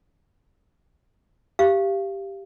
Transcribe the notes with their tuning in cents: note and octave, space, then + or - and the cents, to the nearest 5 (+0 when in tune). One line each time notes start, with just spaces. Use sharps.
G4 +0 F5 -25